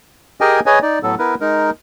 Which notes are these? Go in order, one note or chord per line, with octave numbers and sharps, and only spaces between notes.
G4 G#4 A#4 D#5 G5 G#5
G#4 B4 C#5 D#5 G#5
D#4 D5
A2 F#3 B3 A4
B3 E4 A#4 B4
G#3 D#4 A#4